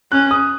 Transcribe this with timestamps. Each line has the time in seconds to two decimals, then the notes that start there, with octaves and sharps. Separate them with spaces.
0.12 C#4 F#6
0.31 D#6